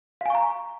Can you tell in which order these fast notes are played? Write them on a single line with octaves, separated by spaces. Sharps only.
F5 G#5 C#6 A#5